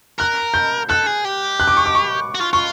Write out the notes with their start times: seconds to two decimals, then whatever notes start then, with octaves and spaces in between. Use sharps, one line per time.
0.19 A#4 F#6
0.54 G6
0.89 A4 F#6
1.06 G#4
1.25 G4
1.60 F#6
1.68 D6
1.77 C#6
1.86 D6
1.95 C#6
2.35 F#4
2.41 F4
2.53 F4 C#6